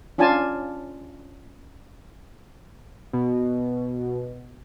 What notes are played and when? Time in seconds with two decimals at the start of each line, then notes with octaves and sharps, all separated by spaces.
0.18 C#4 D4 F4 G#5 A5
3.13 B2